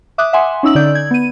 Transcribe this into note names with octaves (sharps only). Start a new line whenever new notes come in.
E5 D6 D#6 F#6
E5 F#5 G#5 C6
C#4 D#4 E6 F#7
D3 D#4 D5 G6
G#6
B3 D#7